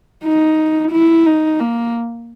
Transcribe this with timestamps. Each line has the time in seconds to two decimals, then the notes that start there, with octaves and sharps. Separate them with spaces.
0.24 D#4
0.92 E4
1.26 D#4
1.60 A#3